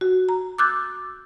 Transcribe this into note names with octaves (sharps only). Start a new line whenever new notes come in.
F#4
A#5
D6 E6 F#6 G6 A6